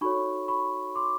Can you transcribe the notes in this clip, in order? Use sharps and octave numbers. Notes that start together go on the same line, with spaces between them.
D#4 F#4 A4 C#5 B5 C#6
B5 C#6
C6 D6